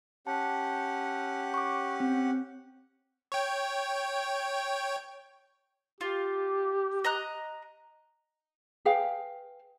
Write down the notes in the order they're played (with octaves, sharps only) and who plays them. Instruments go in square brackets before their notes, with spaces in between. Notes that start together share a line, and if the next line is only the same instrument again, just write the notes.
[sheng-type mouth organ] C#4 G4 F#5 [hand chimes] A5
[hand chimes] C#6 D6
C4
[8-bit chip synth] C#5 G5
[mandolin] F4 [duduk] G4
[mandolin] D#5 A#5 F#6
[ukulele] G#4 B4 F5 G5